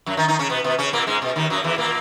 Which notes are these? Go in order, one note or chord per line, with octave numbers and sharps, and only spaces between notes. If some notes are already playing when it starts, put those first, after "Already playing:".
F#2 F#3
D#3 D#4
D#3 D#4
C#3 C#4
B2 B3
B2 B3
C#3 C#4
A#2 A#3
G#2 G#3
B2
D#2 D#3
F#2 F#3
E2 E3
A#2 A#3